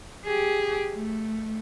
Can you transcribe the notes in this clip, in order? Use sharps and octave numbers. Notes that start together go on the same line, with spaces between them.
G4 G#4
A3